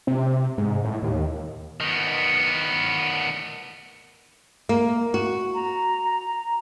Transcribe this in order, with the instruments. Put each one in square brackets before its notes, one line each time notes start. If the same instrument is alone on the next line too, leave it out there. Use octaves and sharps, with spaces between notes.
[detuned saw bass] C3
G#2
A2
D#2
[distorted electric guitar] D#3 B3
[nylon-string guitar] A#3
F#4
[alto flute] A#5